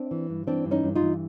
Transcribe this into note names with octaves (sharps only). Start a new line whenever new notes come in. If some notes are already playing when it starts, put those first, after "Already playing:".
Already playing: C4 D4
E3
G2
E3 C4 D4
G2
C#4 D#4
G2
D#4 F4
E3